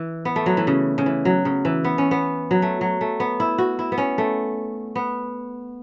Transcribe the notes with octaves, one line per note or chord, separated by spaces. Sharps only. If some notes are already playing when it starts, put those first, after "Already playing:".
Already playing: E3
B3
A3
F#3
E3
C#3
C#3
E3
F#3
C#3
E3
B3
C#4
B3
F#3
A3
F#3
A3
B3
E4
F#4
E4
B3
C#4
A3
B3